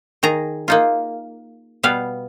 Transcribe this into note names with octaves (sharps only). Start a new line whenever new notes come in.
D#3 G#4 A#5
A#3 D#4 F4
B2 G3 B3 F5